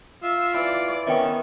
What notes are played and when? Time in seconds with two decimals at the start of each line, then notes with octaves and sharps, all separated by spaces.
0.22 F4 E5
0.54 E3 D5
1.07 D#3 B3 C#4 E5 G5